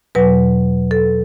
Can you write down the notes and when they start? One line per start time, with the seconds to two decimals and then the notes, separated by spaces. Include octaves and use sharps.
0.15 E2 B2 F#3 B4
0.91 A4